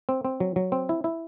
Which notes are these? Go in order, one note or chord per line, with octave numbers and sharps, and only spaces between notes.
C4
C4
F#3
F#3
C4
E4
E4